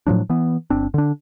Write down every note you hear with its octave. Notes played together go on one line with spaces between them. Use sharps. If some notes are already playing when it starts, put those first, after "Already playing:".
A2 F3 F#3 D4
E3 B3
G1 C4 D4
D3 D4